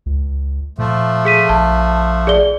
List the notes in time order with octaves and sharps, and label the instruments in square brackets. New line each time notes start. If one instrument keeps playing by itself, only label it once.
[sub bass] C#2
[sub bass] A#2 [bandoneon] F3 A3
[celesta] G#4 B6 D#7
[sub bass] A#1 [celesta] A5
[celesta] G#4 D5 G7